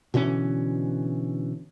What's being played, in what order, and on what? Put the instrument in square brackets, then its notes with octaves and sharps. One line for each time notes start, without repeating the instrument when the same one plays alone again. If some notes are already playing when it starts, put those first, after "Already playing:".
[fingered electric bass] B2 D3 E3 C#4